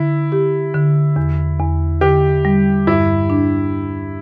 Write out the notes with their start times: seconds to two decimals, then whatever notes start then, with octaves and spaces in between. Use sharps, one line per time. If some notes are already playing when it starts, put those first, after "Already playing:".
Already playing: D3 E4
0.32 G4
0.74 D3
1.16 E2
1.59 E2
2.01 D3 G4
2.45 G3
2.87 G2 E4
3.30 D4